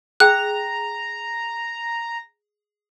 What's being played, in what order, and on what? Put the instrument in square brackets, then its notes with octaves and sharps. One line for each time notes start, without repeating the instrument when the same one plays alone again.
[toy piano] G#4 G5 [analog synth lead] A#5 [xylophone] F#6